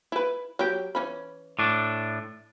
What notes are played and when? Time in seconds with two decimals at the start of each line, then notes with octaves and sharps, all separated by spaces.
0.12 E4 B4
0.59 F#3 G4
0.95 E3 C#4 B5
1.59 A2 D4